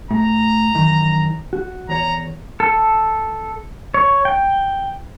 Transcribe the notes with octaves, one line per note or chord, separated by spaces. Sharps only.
A2 A#5
F#2 D#3 E3
F#4
E2 C#5 A#5
A4
C#5
G5